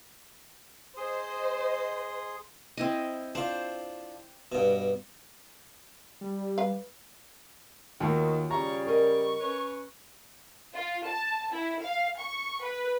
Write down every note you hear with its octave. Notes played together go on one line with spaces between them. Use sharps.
G#4 C5 D#5 C6 D#6
C4 E4 D#5
D4 F4 C5
G2 B2
G3
B4 F5
D#2 D#3 F4 F#4 C#5
C#3 G3 A#5 C#6
A#4 D#5 C#6
C#4 B4 C#5
F4
A5
E4
F5
C#6
B4